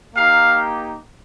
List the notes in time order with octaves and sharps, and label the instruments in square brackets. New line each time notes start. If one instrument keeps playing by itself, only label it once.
[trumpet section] A#3 D#4 G4 F5